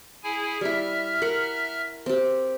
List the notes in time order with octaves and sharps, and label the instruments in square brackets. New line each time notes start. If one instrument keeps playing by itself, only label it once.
[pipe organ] E4 G#4 G#5
[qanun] G3 E4 [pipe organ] E5 F6
[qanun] A#4 F#5
C4 G4